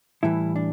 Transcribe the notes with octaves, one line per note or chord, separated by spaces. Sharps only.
A2 E3 G3 E4
D4